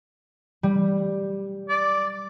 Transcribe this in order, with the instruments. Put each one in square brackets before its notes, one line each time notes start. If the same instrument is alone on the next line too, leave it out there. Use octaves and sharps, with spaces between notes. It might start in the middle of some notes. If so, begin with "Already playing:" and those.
[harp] G3
[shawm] D5